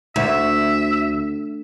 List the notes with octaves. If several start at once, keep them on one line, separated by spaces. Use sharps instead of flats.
D2 E5